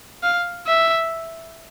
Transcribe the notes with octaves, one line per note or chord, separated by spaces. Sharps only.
F5
E5